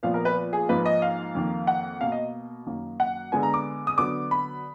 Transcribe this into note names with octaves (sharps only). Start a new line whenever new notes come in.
A#2 F3 B3 F5
A#4
B4
G#4
G#2 F3 A#3 B4
D#5
F5
F2 D#3 A#3
F#5
B2 A#3 F5
D#5
F#2 D#3 F#3 A#3
F#5
D3 G#3 B3 G#5
A#5
D6
D#6
D3 F#3 B3 D6
B5